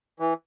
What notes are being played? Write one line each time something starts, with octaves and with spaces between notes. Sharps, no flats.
E3